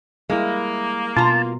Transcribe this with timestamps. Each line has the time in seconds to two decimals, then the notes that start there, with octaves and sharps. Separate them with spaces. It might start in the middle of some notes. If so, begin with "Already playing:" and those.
0.30 G3 G#3 A#3 E4
1.17 B2 F4 A5 A#5